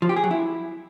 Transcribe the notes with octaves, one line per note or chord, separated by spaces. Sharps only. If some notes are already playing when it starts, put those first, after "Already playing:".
F3
G4
G#4
F#3
E4